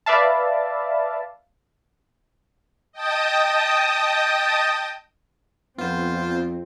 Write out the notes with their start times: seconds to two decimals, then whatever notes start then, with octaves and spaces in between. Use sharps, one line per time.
0.06 B4 D5 E5 F5 A5
2.93 D#5 G5 A5 D#6
5.78 F2 B3 C4 F4 C5